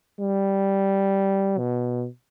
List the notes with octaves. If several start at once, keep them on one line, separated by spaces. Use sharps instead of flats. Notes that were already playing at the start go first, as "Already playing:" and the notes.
G3
B2